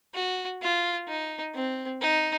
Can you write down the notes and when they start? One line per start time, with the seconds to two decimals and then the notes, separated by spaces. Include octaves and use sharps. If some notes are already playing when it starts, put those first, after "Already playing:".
0.14 F#4
0.62 F4
1.08 D#4
1.54 C4
2.01 D#4